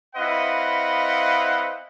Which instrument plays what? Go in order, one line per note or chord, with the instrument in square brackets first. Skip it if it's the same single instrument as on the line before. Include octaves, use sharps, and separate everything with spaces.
[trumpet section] C4 E4 B4 D#5 F5 F#5